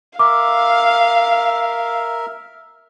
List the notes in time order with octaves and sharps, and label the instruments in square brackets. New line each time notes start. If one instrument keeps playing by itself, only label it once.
[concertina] A#4 E5 [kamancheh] F5 [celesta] D6